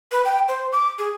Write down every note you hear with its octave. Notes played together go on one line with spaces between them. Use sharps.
B4
G5
C5
D6
G#4